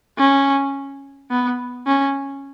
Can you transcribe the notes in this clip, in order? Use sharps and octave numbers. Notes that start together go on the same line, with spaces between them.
C#4
B3
C#4